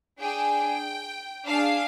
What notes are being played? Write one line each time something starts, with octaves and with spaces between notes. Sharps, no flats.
D4 G#4 G5
D4 G#4 F5